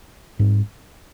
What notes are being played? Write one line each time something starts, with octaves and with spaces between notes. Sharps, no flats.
G#2 G3 C4